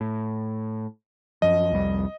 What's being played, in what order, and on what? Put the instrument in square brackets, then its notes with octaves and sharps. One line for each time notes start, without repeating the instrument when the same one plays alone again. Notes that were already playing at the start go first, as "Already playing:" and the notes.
[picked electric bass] A2
[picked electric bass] F#2 F3 [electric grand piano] D#5
[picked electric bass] C2 F2 G3